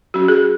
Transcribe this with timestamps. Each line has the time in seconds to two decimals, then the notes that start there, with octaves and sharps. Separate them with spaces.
0.14 F#3 C#4 F#4
0.28 G#4